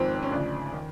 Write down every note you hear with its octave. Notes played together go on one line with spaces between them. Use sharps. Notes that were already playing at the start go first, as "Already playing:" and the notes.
Already playing: G#1 G#2 F3 C4
C4
C#4
D2 C#3 F3 D4
D#3